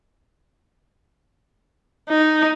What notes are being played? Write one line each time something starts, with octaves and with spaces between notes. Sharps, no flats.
D#4